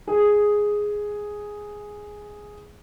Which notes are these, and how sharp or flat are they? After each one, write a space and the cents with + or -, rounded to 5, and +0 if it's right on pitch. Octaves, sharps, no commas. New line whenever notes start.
G#4 +0